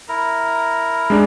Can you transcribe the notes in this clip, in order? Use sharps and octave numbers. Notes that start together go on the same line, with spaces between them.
E4 A#4 A#5
G#3 D4 D5